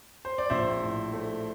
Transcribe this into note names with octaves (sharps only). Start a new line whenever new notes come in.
C5
D5
A#1 C5 E5
A2
A3